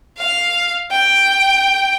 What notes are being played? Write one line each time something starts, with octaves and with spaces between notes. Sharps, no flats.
F5
G5